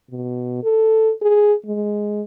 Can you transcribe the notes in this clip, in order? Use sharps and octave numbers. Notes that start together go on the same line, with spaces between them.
B2
A4
G#4
G#3